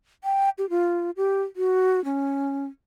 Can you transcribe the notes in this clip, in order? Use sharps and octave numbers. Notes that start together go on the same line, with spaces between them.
G5
G4
F4
G4
F#4
C#4